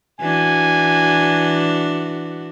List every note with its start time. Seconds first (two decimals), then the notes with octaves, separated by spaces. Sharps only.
0.20 E3 D4 F#4 G#5